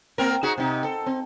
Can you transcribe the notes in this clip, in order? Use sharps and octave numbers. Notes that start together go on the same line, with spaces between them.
A#3 C4 A#4
D#4 F#4 G#4
C3 D#4
A4
C4